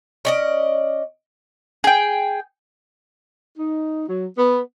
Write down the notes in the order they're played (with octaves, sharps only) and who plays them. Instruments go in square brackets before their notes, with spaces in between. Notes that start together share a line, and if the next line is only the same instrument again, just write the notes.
[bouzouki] C#4 D5 D#5
[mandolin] G#4 G5
[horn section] D#4
F#3
B3